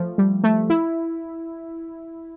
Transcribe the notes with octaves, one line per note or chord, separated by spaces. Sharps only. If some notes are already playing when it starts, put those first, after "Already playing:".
Already playing: F3 A3
G3
A3
E4